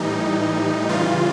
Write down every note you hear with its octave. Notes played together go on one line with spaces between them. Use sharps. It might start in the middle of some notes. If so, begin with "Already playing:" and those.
Already playing: A2 E3 G3 D#4
C#3 E3 G3 F4